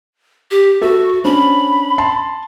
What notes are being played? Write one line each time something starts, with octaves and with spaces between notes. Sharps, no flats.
G4
F#4 A4 E5
C#4 D4 C5 B5
A5 C6